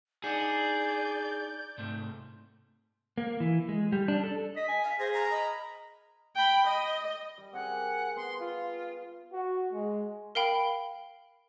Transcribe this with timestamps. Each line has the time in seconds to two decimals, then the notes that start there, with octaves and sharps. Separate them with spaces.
0.24 D4 D#4 G#4 D5 F#5 G6
1.78 G#2 C3 A3
3.18 A#3
3.40 E3
3.69 G#3
3.92 G3
4.08 D4
4.24 A4
4.56 D#5 B6
4.68 G#5
4.84 F5
4.99 G#4 C5 A#6
5.14 A#5
5.32 D#5 B5
6.36 G5 B5
6.67 D#5
7.38 G3
7.53 C4 G#4 A#4 F#5
8.16 B3 C6
8.40 F4
9.33 F#4
9.73 G#3
10.35 A#4 F5 G5 B5